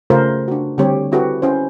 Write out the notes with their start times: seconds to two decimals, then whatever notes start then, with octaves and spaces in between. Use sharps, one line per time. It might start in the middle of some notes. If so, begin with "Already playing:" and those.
0.10 C#3 A3 F4 A4 A#4 C5
0.48 D4 F#4
0.78 D3 G3 C4 G4 C#5
1.11 C4 E4 F#4 G4 A4 B4
1.42 C#4 E4 C5